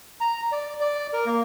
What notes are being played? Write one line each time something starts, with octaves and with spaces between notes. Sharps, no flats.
A#5
D5
D5
A#4
A#3